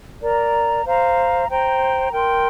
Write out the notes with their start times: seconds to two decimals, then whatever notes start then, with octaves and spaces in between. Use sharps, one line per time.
0.21 A#4 D5 A#5
0.85 C5 F5 A#5
1.48 C5 G5 A#5
2.11 A#4 G5 C6